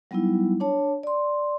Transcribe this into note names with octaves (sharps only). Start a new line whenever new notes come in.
F#3 G3 B3 D#4 E4
D4 C#5 A5
D5 C6